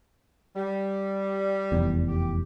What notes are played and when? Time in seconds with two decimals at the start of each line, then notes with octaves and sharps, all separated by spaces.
0.56 G3
1.72 F1 E2
2.08 G4